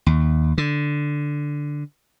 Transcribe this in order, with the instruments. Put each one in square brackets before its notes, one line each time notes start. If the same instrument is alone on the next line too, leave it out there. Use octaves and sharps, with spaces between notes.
[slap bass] D#2
D3